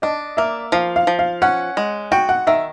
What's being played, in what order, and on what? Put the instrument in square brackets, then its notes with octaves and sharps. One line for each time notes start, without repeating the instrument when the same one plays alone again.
[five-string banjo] D4 [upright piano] D#5
[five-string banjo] A#3 [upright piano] E5
[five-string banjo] F3 [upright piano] F5
[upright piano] F5
[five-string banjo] F3
[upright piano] F5
[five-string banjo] C#4 [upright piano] F#5
[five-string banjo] G#3
[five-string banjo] F#4 [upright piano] G5
[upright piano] F#5
[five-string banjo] D#3 [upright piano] E5